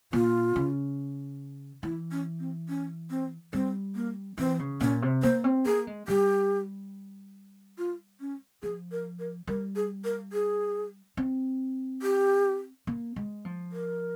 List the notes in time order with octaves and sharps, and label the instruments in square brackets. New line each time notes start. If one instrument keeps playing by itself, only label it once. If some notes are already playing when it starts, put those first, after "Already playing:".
[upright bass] A#2 [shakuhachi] F4
[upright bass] C#3
[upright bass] E3 [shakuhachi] E4
[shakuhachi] C#4
C4
C#4
C4
[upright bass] G3 [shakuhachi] C4
[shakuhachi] A#3
[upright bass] E3 [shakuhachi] C4
[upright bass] C#3
[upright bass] A#2 [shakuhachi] C#4
[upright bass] C3
[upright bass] A#3 [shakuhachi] C5
[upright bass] C4
[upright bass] A#3 [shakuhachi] G#4
[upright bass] G#3
[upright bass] G3 [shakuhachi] G4
[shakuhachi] F4
C#4
[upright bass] F3 [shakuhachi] G#4
[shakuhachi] A#4
A#4
[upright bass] G3 [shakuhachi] A#4
[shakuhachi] G#4
A#4
G#4
[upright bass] C4
[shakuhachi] G4
[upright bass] A#3
G#3
F3
[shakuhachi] A#4